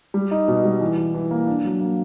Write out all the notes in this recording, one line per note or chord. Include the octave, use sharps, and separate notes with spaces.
G3
D#4
B2
G3
E3
E3
E3
A#3
D4
F#3
A#3